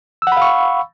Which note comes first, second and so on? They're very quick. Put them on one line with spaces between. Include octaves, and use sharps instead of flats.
E6 F#5 B5 F5 C#6